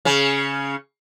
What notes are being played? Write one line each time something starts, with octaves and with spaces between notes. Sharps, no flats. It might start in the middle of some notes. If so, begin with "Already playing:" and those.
C#3 C#4